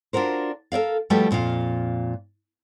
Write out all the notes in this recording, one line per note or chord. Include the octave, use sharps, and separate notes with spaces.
D4 F4 F#4 A#4 C5
A4 A#4 D5 F5
F3 G3 A3 F#4 G4 B4
F2 A#2 F4 F5